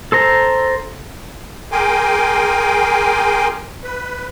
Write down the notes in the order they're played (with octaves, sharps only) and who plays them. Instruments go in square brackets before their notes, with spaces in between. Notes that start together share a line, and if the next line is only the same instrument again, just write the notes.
[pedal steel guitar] A4 C5 A#5
[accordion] G#4 A#4 G5 G#5 C6 D6
B4